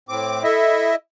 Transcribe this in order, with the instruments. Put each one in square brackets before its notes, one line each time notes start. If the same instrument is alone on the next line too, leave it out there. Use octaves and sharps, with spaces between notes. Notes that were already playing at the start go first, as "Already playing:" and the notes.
[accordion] A2 C4 D6
[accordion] E4 D#5 E5 [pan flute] A4